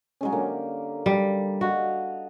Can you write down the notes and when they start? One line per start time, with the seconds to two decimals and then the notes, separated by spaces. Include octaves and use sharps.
0.21 F#3 G#3 C#4
0.32 D3 A#3 G4
1.06 G3
1.61 F#4 D#5 F5 A5